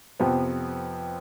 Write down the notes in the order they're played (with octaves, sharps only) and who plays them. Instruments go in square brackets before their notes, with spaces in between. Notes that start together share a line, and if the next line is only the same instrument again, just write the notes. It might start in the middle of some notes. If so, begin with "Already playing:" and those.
[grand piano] F2 C3 F3 B3